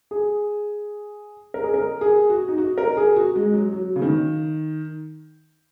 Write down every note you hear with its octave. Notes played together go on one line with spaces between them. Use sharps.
G#4
A#4
G#4
A#4
G#4
F#4
D#4
F#4
A#4
G#4
F#4
G#3
F#3
F#3
C#3
D#3